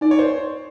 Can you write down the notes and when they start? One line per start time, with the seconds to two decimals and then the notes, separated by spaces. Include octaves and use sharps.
0.01 D#4 D5
0.11 C#5
0.19 C5